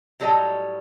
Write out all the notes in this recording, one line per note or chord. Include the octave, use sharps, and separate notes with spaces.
A2 F#3 G3 A4 D#5 G5